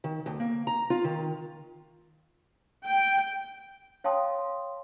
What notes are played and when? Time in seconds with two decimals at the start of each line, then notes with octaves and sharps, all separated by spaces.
0.04 D#3
0.26 D2
0.40 A#3
0.67 A#5
0.90 F4
1.04 D#3
2.86 G5
4.04 C#5 F5 G5 A5 C6 D#6